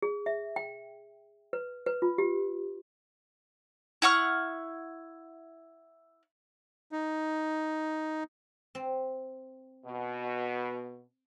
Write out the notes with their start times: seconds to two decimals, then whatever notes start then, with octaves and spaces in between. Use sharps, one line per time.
0.02 G#4
0.26 E5
0.56 G5
1.53 B4
1.86 B4
2.02 F4
2.18 G4
4.02 E4 F#5 C#6 F6
6.92 D#4
8.75 C4
9.86 B2